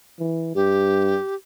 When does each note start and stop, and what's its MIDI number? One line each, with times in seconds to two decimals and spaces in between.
0.19 0.53 52
0.55 1.18 43
0.55 1.35 67